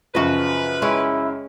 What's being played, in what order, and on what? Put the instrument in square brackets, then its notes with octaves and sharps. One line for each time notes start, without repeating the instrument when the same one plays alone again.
[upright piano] F#2 C#3 F3 [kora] F#4 D#5 [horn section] B4
[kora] G#3 C#4 G5 [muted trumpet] E4